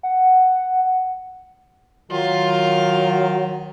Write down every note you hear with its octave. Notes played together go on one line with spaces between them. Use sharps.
F#5
D#3 F#3 F4